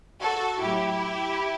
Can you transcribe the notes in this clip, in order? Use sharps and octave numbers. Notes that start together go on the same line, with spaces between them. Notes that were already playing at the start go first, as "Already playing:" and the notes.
F#4 A4
A2 F#3 E4 G4